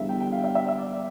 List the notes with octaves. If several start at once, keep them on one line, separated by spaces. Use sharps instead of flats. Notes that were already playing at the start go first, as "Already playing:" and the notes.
Already playing: E2 D3 G3 E5 F5
G5
G5
F5
E5
E5
E5
D5